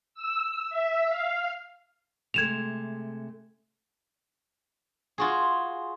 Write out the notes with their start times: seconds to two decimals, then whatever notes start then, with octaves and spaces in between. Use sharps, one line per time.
0.14 E6
0.69 E5
1.08 F5
2.34 C3 G#3 A3 G#6 E7 F7
5.18 F4 F#4 G#4